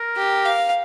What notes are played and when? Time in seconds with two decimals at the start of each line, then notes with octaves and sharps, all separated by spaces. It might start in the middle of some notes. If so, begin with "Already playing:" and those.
Already playing: A#4
0.17 G4
0.45 F5